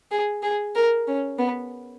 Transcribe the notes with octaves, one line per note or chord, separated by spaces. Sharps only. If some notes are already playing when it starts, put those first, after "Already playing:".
G#4
G#4
A#4
C#4
B3